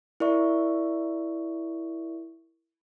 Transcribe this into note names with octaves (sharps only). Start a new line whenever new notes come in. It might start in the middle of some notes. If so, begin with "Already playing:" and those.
E4 A#4 D5 E5 C#6